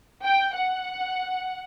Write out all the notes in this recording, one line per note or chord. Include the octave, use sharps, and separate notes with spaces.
G5
F#5